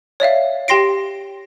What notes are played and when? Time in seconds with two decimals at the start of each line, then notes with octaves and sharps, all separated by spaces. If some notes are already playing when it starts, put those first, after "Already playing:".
0.20 C#5 D5 E5 F5
0.68 G4 G5 C6 A#6 C7 D7